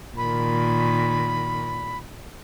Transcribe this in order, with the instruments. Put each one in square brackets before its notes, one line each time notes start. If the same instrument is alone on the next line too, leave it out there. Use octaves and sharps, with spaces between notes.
[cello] A#2 D#3 [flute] B5